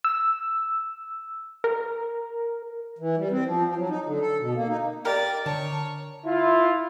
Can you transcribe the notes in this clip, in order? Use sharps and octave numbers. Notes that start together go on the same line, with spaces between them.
E6
A#4
E3
G3
C4
F3
F3
F#3
D#4
D3
A4
B2
A#3
D#4
G4 A#4 D5 D#5
D3 C#5 A5
E4 F4